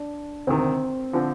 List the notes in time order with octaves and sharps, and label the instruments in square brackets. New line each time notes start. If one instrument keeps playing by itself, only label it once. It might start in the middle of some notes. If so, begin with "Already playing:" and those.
Already playing: [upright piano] D4
[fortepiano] D2 C3 D#3 [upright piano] C4
[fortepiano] D3 F3 C4